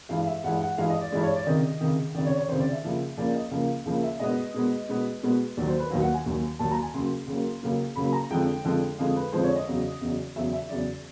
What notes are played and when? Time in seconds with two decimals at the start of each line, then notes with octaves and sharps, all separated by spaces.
0.09 G2 E3 G#3 F5
0.27 E5
0.44 G2 E3 G#3 F#5
0.61 F#5
0.78 G2 E3 G#3 F5
0.89 D#5
1.01 D5
1.12 G2 E3 G#3 D5
1.23 C#5
1.36 D5
1.47 C#2 C3 D#3 D#5
1.81 C#2 C3 D#3
2.15 C#2 C3 D#3 D5
2.26 C#5
2.37 C#5
2.48 C#2 C3 D#3 C5
2.60 D5
2.72 E5
2.83 C#2 C#3 F3 A#3
3.17 C#2 C#3 F3 A#3 D5
3.35 D#5
3.51 C#2 C#3 F3 A#3 F5
3.85 C#2 C#3 F3 A#3
4.03 E5
4.19 B2 G#3 B3 D#5
4.54 B2 G#3 B3
4.89 B2 G#3 B3
5.23 B2 G#3 B3
5.57 D#2 D#3 F#3 D5
5.68 C5
5.80 B4
5.90 D#2 D#3 F#3 F5
6.02 F#5
6.14 G#5
6.26 D#2 D#3 F#3
6.59 D#2 D#3 F#3 A5
6.71 A#5
6.82 G#5
6.94 C#2 C#3 F#3 A#3 C6
7.27 C#2 C#3 F#3 A#3
7.62 C#2 C#3 F#3 A#3
7.96 C#2 C#3 F#3 A#3 B5
8.13 A#5
8.30 F2 D3 F3 G#3 G5
8.65 F2 D3 F3 G#3
8.98 F2 D3 F3 G#3 F5
9.16 B4
9.32 F2 D3 F3 G#3 C5
9.44 C#5
9.55 D#5
9.68 E2 C#3 F#3
10.01 E2 C#3 F#3
10.36 E2 C#3 F#3 E5
10.53 E5
10.69 E2 C#3 F#3 D5